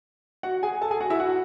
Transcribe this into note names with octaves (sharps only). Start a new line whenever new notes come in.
F#4 F#5
G#4 G#5
A4 A5
G#4 G#5
F#4 F#5
E4 E5
F#4 F#5